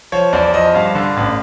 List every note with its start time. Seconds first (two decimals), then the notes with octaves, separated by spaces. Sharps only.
0.12 F3 C#5
0.33 E2 D5
0.54 F3 D#5
0.74 G2 F5
0.95 D3
1.17 A1